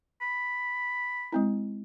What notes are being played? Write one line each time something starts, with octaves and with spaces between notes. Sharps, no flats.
B5
G#3 C4 E4